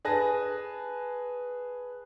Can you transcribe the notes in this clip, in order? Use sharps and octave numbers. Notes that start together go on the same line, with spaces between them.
G#4 B4 A5 A#6